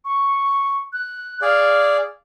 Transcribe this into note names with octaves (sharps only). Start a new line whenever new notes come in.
C#6
F#6
G#4 D5 F5